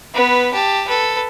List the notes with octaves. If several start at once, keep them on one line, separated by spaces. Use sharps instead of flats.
B3 B4
G4 A5
A4 B4